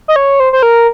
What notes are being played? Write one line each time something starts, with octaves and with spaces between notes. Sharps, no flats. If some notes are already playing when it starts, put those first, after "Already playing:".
D#5
C#5
C5
C5
A#4